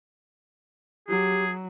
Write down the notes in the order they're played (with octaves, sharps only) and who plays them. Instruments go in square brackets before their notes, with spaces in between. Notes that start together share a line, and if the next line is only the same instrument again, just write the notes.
[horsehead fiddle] F#3 [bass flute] G4 [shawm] G#4